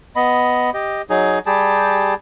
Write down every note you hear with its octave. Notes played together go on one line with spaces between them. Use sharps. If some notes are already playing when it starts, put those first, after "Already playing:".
B3 D#5 B5
G4 D#5
F#3 D#4 G#4
G3 G4 G#4 A5